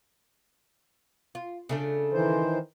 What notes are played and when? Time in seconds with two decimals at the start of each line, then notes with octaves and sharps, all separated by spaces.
1.35 F4
1.69 C#3 A3 D4
2.13 D#3 E3 C5